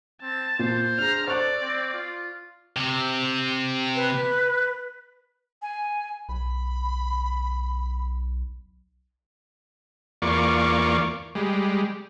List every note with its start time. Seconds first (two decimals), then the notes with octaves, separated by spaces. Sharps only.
0.22 C4 A5
0.59 A#2 C5
0.98 D4 G#4 A#5 F6
1.27 A4 C5 D5 C#6 F#6
1.62 C4
1.94 F4
2.76 C3
3.96 B4
5.62 G#5
6.29 B1 B5
10.22 E2 A#3 F4 D5 C#6
11.35 G3 G#3